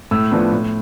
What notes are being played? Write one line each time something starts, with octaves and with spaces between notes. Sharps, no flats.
A2 E6
F3 B3 D4
A2